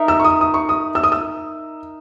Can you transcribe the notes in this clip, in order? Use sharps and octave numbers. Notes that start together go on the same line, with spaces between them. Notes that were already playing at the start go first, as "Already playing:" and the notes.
Already playing: D#4 A#4 E5
E6
C#6
D#6
D#6
C#6
D#6
E6
D#6
E6